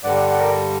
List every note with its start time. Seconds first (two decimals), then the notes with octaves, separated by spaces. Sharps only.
0.04 G2 D3 G3 D5 F#5
0.15 D5 F#5
0.27 D5 F#5
0.38 A#4 D5